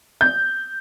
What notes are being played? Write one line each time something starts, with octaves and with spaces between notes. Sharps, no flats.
G6